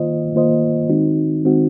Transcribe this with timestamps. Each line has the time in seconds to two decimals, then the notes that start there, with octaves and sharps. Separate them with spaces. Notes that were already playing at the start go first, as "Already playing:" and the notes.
Already playing: D#3 A#3 F4 C5 D#5
0.35 D#3 A#3 F4 C5 D#5
0.89 D#3 G#3 C4 D#4 F#4
1.44 D#3 G#3 C4 D#4 F#4